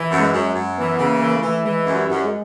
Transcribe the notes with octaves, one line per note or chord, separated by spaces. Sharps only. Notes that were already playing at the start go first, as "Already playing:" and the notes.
Already playing: E3
F#2
G#3
F#2
F#2
E3 B3
C#3
A#3
E3
A3
E3
E3 G#3
F#2
G3
F#2
G#3